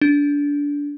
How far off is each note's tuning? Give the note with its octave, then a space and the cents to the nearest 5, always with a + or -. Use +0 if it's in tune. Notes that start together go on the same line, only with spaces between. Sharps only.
D4 -25